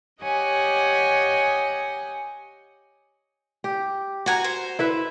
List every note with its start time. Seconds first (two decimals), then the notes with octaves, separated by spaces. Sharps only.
0.22 G4 C#5 D#5 F#5 G#5
3.64 G4
4.26 F#4 F#5 G#5 A#5
4.44 C5
4.79 E4 B4 E5